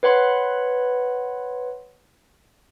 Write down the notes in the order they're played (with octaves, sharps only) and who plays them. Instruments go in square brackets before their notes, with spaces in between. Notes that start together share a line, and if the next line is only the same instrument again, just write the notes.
[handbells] B4 C#5 F#5 B5 C6